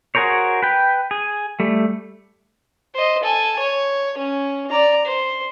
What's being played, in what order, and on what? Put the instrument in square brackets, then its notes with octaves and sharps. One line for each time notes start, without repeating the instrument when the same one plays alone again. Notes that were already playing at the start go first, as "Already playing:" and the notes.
[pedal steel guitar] F#4 G#4 A#4 C5 C#5
B4 G5
G#4
G3 A3
[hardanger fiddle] C5 D#5
A4 G#5
C#5
C#4
D5 A#5
C5